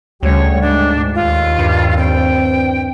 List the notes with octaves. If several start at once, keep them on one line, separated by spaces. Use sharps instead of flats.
D2 C#3 G3 C#5
G#2 D4
D#2 F4
G2
C4 G5